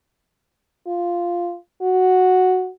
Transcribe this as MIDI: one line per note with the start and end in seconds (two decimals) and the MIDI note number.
0.87 1.56 65
1.82 2.69 66